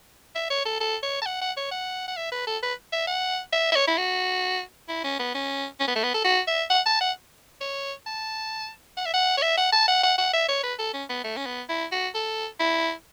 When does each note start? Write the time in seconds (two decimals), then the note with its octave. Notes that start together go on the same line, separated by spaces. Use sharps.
0.35 E5
0.50 C#5
0.65 A4
0.80 A4
1.03 C#5
1.22 A5
1.26 F#5
1.41 F#5
1.57 C#5
1.71 F#5
2.08 F#5
2.17 E5
2.32 B4
2.47 A4
2.62 B4
2.93 E5
3.07 F#5
3.53 E5
3.72 E5
3.75 C#5
3.87 E4
3.98 F#4
4.88 E4
5.04 C#4
5.19 B3
5.34 C#4
5.80 C#4
5.88 B3
5.96 A3
6.03 B3
6.14 A4
6.24 F#4
6.48 E5
6.70 F#5
6.86 A5
7.01 F#5
7.61 C#5
8.06 A5
8.97 F#5
9.06 E5
9.14 F#5
9.37 C#5
9.42 E5
9.57 F#5
9.72 A5
9.88 F#5
10.03 F#5
10.18 F#5
10.33 E5
10.48 C#5
10.63 B4
10.79 A4
10.93 C#4
11.09 B3
11.24 A3
11.37 C#4
11.46 B3
11.69 E4
11.92 F#4
12.15 A4
12.60 E4